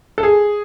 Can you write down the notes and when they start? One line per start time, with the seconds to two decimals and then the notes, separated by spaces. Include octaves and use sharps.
0.18 A4
0.23 G#4